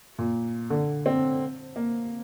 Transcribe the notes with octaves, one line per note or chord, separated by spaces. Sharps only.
A#2
D3
C4
A#3